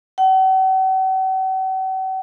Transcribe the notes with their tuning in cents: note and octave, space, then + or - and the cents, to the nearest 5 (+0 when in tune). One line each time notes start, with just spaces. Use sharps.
F#5 +45